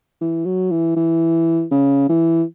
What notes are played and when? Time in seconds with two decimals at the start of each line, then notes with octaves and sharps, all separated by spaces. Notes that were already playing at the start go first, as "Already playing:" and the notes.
0.21 E3
0.46 F#3
0.71 E3
0.96 E3
1.71 C#3
2.09 E3